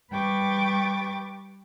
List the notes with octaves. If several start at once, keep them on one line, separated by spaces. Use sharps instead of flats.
G3 B4 G5 C#6 D6 A6